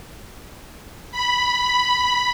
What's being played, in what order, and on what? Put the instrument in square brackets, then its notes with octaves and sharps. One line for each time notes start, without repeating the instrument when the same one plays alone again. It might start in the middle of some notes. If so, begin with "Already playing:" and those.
[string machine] B5